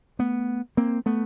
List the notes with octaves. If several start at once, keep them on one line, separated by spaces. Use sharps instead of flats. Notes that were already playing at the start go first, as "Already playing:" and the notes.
A3 B3
A#3 C4
A3 B3